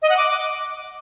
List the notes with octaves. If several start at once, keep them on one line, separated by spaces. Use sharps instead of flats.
D#5
F#5
D6